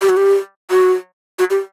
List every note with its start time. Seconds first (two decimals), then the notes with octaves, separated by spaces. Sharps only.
0.02 G4
0.09 F#4
0.17 G4
0.71 F#4
1.39 F#4
1.50 G4